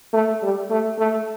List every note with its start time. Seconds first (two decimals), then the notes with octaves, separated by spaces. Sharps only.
0.13 A3
0.42 G3
0.70 A3
0.99 A3